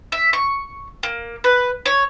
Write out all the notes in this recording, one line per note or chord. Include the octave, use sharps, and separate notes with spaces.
E5
C#6
A#3
B4
C#5